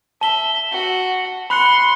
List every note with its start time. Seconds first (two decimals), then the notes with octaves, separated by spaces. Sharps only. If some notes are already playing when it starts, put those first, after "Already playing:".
0.21 E5 A5 G7
0.71 F#4
1.50 B5 C6 F#6 C#7